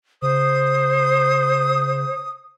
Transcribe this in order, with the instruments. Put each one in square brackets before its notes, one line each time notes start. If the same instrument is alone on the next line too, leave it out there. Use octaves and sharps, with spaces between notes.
[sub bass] C#3 [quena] C5 [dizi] D#6